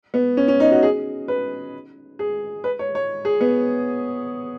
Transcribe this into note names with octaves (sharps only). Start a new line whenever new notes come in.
B3
C#4
C#4
D#4
F#4
G#4
B4
G#4
B4
C#5
C#5
G#4
B3